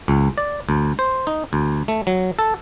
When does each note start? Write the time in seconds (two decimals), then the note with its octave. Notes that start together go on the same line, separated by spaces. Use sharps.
0.08 C#2
0.38 D5
0.69 D2
0.99 C5
1.27 D#4
1.53 D2
1.88 A3
2.07 F#3
2.39 A4